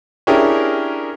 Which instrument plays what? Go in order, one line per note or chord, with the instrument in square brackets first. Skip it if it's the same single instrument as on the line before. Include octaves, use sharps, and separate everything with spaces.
[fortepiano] C#4 D4 E4 G4 G#4 A#4